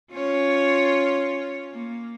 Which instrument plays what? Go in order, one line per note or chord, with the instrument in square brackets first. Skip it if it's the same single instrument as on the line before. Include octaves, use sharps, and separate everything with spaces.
[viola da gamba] C#4 F4 C#5
A#3